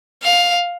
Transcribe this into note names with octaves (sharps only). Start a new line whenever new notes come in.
F5